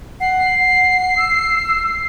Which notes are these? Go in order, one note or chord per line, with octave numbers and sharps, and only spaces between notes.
F#5 C7
F#5
E6